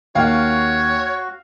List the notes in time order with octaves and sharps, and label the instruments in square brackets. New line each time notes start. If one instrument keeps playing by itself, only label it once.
[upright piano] D#2 [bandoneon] F#4 [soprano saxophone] C#5 [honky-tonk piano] F5